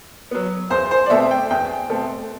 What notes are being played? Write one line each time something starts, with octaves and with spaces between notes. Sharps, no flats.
F#3 B3
E2 C5
C5
D5
B2 A3 C4 E5
G5
E2 G5
B2 A3 C4